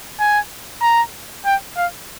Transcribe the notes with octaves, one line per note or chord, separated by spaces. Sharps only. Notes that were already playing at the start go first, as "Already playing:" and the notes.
G#5
A#5
G5
F5